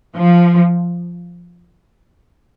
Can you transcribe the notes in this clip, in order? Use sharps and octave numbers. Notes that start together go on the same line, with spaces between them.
F3